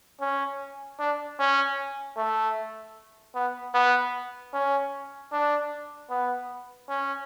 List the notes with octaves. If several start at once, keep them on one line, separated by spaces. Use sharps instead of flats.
C#4
D4
C#4
A3
B3
B3
C#4
D4
B3
C#4